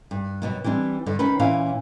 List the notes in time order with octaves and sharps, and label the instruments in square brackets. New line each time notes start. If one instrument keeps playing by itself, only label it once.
[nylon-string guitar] G2
G2 B2 F#3
E3 G3 C4 D4
G2 D3
D#3 C#4 B4
A#2 E3 C#4 F5